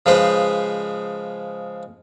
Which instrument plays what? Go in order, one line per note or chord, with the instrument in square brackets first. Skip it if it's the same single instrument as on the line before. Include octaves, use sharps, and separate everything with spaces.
[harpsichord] C#3 F3 G#3 B4 C5